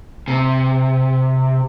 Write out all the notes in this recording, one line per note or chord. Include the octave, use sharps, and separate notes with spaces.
C3